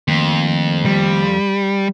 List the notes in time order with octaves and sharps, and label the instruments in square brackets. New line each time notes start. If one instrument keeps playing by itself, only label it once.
[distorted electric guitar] F2 [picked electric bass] D#3 A3 A#3
[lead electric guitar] G3